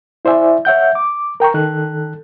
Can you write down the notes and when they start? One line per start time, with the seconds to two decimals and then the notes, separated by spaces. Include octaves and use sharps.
0.25 E4 C5 D5 E5 G#5
0.65 C#5 E5 F#5 G6
0.95 D6
1.40 A#4 G5 A#5 C#6
1.54 D#3 A4 F#6